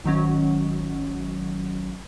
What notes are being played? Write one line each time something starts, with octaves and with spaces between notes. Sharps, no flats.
G#1 D#3 F#3 C#4